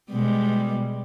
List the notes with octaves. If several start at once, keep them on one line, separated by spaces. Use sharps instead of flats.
B2 G3 G#3